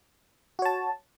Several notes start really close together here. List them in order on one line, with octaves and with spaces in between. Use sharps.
F#4 C#5 A5